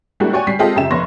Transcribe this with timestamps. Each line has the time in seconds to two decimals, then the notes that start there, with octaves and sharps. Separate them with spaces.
0.20 G3 G#3 A#3 D4 E4 F#4
0.33 F#4 C#5 D5 G5 G#5 C#6
0.47 G3 B6 C7
0.59 G#3 C4 F4 G4 A4 D#5
0.76 F#2 C#3 G4 E5 E7
0.90 F1 B3 C#5 C6 A#6